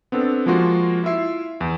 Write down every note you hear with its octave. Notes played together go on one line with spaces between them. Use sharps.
B3 C4 D4 A4
F3 G#3 A#3 F4 F#4 A#4
E4 F4 E5 C7
E2